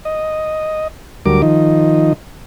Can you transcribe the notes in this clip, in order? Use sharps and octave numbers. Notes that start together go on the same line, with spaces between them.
D#5
D2 F#3 G3 A#4 D6
D#3 F3 D#4